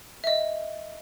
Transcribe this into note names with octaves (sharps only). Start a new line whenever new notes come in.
D#5 E5